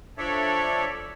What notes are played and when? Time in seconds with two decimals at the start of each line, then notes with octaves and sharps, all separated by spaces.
0.18 F3 D4 A4 C#5 D5 E5